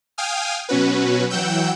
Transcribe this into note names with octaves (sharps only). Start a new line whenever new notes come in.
F5 G5 G#5 D#6 F6
B2 F#3 C#4 F#4 B4
E3 F#3 F#5 G5 E6 G6